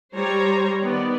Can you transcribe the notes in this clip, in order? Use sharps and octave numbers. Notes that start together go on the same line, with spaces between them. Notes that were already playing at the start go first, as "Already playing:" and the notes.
G3 C5 C#5 A#5
D#3 B3 D5